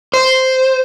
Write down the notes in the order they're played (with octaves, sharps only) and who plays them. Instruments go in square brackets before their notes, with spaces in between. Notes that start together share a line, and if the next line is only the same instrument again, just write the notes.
[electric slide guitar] C5